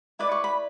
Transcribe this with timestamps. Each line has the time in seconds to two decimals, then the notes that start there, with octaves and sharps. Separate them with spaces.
0.19 E4 B4 D5 D6
0.32 C#6
0.44 B5